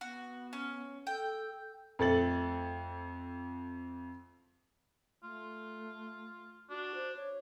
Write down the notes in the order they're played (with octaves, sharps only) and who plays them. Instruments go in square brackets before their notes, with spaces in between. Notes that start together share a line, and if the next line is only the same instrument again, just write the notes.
[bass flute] B3 [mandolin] F#4
[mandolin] C#4
[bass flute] A4 [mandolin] G5
[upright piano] F2 A3 A4 A6 F#7
[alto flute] A3 [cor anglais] F4
[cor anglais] D4 [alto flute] F#4
[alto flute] C5
C#5